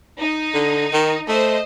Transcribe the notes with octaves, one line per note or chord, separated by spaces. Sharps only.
D#4
D3
D#3
A3 C5 D#5